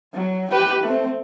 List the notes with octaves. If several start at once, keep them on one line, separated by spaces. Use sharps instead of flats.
F#3
G4 B4
A3 C4